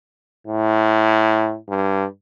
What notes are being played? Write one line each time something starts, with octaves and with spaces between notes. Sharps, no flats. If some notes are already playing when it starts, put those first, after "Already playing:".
A2
G2